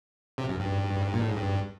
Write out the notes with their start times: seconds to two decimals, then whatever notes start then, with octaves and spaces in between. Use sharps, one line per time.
0.38 C3
0.49 F#2
0.60 G2
1.13 A#2
1.22 A2
1.30 G#2
1.37 G2